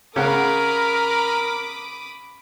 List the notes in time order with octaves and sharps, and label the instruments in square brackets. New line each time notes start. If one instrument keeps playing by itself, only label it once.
[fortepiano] C#3 F#5 [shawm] A#4 [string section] B5 D6 D#6